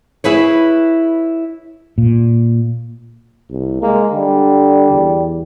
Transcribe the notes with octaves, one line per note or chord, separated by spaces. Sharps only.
E4 G#4 B4 C#5
A#2
C2
G#3 A#3
D3 G3
E2